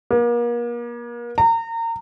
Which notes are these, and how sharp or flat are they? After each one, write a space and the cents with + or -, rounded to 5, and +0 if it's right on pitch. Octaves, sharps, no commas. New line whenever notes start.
A#3 +40
A#5 -30